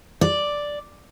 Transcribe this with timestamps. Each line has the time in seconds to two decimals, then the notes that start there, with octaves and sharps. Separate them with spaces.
0.21 D5